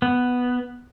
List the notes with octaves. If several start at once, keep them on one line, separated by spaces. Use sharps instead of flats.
B3